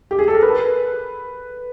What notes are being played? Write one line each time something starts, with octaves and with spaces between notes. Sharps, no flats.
G4
G#4
A4
A#4
B4